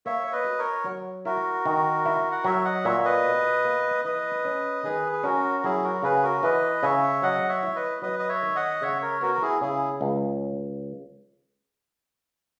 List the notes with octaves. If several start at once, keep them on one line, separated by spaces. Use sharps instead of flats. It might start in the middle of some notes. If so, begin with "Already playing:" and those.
A#3 C#5 E5
C#5
B4 D#5
F#4
A#4 C#5
F#3
E4 F#4 A#4
D#3
E4
F#5
F#3 C#5 E5
D#5 F#5
A#2 C#5 E5
B4 D#5
B2
A#3
E3 B4 D#5
C#4
D#3 G#4 B4
G#4
C#4 F#4 A#4
F#3 E4 G#4
F#4 A#4
C#3 G#4 B4
F#4 A#4
E3 B4 D#5
C#3 C#5 E5
F#3 D#5 F#5
C#5 E5
E4
B4 D#5
F#3 B4 D#5
D#5
C#5 E5
D#3
D#5 F#5
C#3 C#5 E5
A#4 C#5
B3 F#4 A#4
A#4
E4 G#4
C#3 E4 G#4
C#2